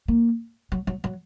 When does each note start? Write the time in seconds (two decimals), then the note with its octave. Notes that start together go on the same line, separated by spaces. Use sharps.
0.08 A#3
0.72 F#3
0.87 F#3
1.04 F#3